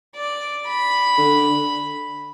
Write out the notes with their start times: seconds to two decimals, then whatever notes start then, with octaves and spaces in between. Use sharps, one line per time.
0.16 D5
0.67 B5
1.18 D3